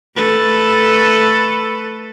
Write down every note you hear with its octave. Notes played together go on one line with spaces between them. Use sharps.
A3 A4 B4